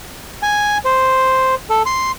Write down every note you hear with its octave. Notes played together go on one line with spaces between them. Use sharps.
G#5
C5
A4
C6